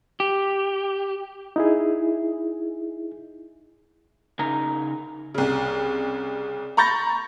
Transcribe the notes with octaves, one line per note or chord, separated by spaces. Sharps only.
G4
D#4 E4 G#4
C#3 D#4 A#4 G#5 A#5
C2 C#3
A#5 B5 C#6 G6 A6 A#6